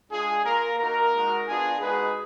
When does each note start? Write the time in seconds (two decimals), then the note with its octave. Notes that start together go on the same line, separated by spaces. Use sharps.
0.10 G#3 D4 F4 G#4
0.44 A#3 F4 A#4
0.78 A#3 D#4 F#4 A#4
1.14 G#3 D#4 F#4
1.47 B3 D4 F4 G#4
1.82 G#3 D#4 F#4 G#4 B4